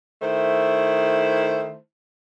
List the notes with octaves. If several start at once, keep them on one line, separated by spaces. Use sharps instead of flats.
D#3 A3 E4 C5